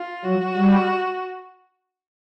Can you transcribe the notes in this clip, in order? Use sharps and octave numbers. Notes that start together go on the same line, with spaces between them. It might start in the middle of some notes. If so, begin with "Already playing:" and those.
Already playing: F4
F#3 F#4
G3